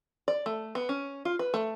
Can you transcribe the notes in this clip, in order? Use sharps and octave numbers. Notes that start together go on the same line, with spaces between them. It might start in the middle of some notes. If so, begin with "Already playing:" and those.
D5
A3
B3
C#4
F4
B4
A3